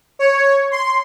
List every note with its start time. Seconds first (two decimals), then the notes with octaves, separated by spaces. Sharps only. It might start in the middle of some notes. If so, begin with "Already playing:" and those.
0.19 C#5
0.71 C6